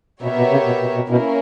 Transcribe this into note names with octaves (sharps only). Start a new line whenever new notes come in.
B2 B3 G4 A#4 C#5 E5
B2
C#3
B2
B2
B2
B2 A#3 C#4 E4 A#4